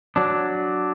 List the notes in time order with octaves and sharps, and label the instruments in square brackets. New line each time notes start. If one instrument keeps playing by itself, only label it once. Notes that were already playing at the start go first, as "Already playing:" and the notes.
[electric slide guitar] F#3 D4